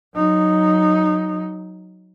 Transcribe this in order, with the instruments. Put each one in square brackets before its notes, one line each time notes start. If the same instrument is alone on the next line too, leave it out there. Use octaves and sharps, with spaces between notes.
[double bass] F#3 D#4